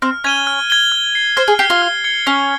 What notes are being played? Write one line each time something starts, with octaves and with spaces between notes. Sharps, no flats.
C4 F6
C#4 G#6 D#7 G7
F6
G#6 D#7 G7
F6
C7 G7
C5 F6
G#4
G4 C7 G7
F4
F6
G#6 C#7 G7
C#4 F6